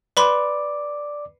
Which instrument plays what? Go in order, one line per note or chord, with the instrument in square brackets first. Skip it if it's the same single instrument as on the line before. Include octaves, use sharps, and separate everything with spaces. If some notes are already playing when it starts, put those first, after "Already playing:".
[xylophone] B4 B5 C6 [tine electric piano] D5 D6